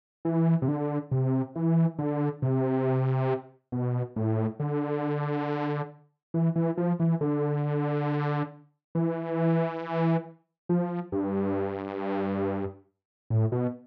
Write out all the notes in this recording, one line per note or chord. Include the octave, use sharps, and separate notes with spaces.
E3
C3
D3
C3
E3
D3
C3
B2
A2
D3
E3
E3
F3
E3
D3
E3
F3
G2
A2
B2